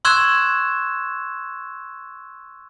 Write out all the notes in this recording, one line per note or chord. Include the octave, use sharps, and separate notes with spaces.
C6 C#6 E6 F#6 G#6 E7